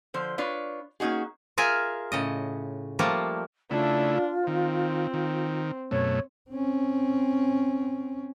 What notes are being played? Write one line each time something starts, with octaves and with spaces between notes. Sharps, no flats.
D3 F3 C5
D4 F4 B4 C#5
A#3 C#4 D#4 F#4 G#4
F4 G#4 A#4 E5 G#5
A2 C#3 D#5
F3 G3 A3 A#3
C#3 A3 D4 E4 F4
D#3 C4
D#3
F#2 B2 A3 C#5
C4 C#4